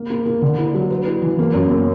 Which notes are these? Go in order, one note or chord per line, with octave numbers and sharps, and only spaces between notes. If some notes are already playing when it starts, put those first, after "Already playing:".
Already playing: A#3
A#3
A#3
D3
E4
F#3
B4
E4
E3
A#3
F#2
A#3